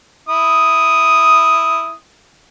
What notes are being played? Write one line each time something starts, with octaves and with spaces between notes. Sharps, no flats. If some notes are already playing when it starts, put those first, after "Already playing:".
E4 D#6